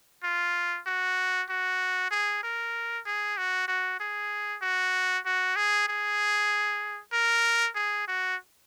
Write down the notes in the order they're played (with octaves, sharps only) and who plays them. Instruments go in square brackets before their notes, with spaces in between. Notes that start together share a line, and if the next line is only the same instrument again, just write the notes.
[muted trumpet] F4
F#4
F#4
G#4
A#4
G#4
F#4
F#4
G#4
F#4
F#4
G#4
G#4
A#4
G#4
F#4